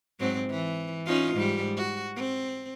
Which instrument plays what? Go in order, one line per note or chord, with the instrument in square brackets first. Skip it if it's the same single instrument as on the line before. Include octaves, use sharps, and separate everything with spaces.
[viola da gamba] G#2 F#3 C4
E3
C#4 D#4 F4
G#2 G3
F#4
C4